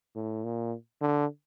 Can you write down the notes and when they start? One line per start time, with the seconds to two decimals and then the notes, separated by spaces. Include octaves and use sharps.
0.16 A2
0.44 A#2
1.01 D3